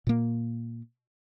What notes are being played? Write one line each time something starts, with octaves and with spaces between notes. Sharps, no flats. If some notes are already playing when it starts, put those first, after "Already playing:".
A#2 A#3